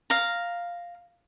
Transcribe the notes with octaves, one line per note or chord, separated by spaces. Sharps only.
F5 A#5